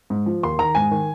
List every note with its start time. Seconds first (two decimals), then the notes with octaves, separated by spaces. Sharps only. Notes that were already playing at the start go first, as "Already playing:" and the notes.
0.10 G#2
0.26 F3
0.43 D#2 C6
0.59 D#3 A#5
0.75 G#2 G#5
0.91 D#3